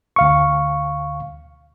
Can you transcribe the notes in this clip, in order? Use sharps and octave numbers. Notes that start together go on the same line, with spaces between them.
D2 F5 C#6